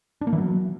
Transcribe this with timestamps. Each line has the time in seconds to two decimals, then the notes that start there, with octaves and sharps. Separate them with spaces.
0.21 D4
0.27 A#3
0.33 E3
0.38 F#3